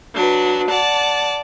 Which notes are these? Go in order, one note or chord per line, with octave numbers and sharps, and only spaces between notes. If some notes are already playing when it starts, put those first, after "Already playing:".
F#3 D4 B4
D5 F#5 A5